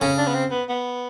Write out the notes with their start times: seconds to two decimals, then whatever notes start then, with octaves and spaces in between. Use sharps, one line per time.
0.01 C#3 C#4
0.18 D4
0.27 B3
0.34 C4
0.51 B3
0.69 B3